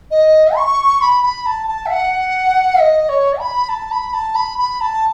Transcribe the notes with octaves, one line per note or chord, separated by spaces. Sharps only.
D#5
C#6
B5
B5
A5
A5
E5
F#5
D#5
C#5
B5
A5
B5
A5
B5
B5
A5